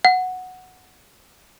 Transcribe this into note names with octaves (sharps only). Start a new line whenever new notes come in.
F#5